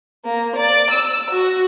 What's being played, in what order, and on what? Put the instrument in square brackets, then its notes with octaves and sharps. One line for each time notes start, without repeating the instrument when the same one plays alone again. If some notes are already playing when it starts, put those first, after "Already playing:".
[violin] A#3
D5
E6
F#4